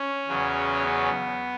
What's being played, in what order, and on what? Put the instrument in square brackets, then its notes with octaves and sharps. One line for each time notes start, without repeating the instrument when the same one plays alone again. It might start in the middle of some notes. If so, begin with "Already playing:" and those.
Already playing: [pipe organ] C#4
E2 C#3 F#3
B3